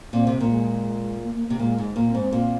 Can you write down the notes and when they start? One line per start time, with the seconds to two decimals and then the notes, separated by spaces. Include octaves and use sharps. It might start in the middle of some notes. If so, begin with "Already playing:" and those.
0.13 A#2 C4
0.27 C3
0.40 A#2
0.49 G#3
1.23 A#3
1.35 A#3
1.48 C3 A#3
1.59 A#2 G#3
1.78 G#2
1.96 A#2 A#3
2.09 C4
2.15 G#2
2.21 C4
2.32 A#2